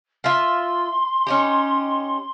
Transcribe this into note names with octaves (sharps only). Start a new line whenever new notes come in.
F4 E5 C6
C#4 D#4 G4